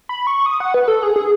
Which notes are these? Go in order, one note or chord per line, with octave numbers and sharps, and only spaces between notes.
B5
C#6
D#6
F#5
B4
A4
G#4
G#4